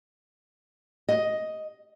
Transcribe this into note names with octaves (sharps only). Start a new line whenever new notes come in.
D#5